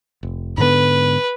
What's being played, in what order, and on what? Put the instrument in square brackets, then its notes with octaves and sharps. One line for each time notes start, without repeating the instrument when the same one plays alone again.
[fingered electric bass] F1
[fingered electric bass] G#2 D3 B3 [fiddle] B4